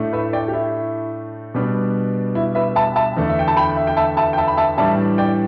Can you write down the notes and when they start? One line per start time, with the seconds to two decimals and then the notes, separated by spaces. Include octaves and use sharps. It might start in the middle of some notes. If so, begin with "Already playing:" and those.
Already playing: A2 A3 D4
0.13 B4 E5
0.33 D5 G5
0.48 G4
0.53 E4
1.54 B2 G3 B3 D4
2.35 E4
2.55 B4 E5
2.76 E5 A5
2.96 E5 A5
3.17 E2 D3 A3 D4
3.29 E5
3.39 G5
3.48 A5
3.57 G5 B5
3.77 E5
3.87 G5
3.97 E5 A5
4.17 E5 A5
4.33 G5
4.38 E5 A5
4.48 B5
4.57 E5 A5
4.77 A2 E3 G3 D4 E5 A5
5.18 D5 G5